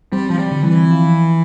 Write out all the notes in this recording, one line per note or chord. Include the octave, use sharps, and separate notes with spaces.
G3 C4
F3
G3
D3
E3
F3